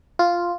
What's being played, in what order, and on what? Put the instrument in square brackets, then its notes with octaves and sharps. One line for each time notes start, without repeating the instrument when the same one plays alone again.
[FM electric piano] F4